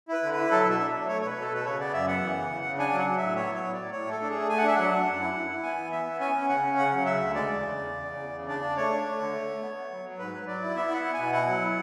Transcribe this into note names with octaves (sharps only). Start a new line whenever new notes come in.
E4 B4
D3
B4
E4
F#3 A4
B2 E5
D4
F#3
A3 C#5
B2 B4 C#5
B2
A4
B2 B4
C#3 C#5
B3 D5
F#2 E5
B3 F#5
E3
C#3
C#3
C#3
D4 G#5
F#3
F#5
F#3
A2 E5
B3 C#5
F#3 C#5
A2
D5
A2
A2 C#5
A3 A4
D4
A3 G#4
A3 G#5
F#5
D4 E5
F#3 F#5
D4
F#2
E4
E4
E4
B3 G#5
E3
B3 E5
B3
C#4 G#5
C#4
C#3 F#5
C#4
C#3 F#5
F#3
C#3 E5
D2
G#3 D5
E2
C#3
E2
E2
C#3
E2
C#3
D4 D5
D4
A3 C#5
D4
A3
D3
A3
A3
B3
B3
F#3
F#3
G#2 B4
F#3
F#3 D5
E4
B3 E5
E4 F#5
B3
B2 G#5
E4 F#5
F#3
B3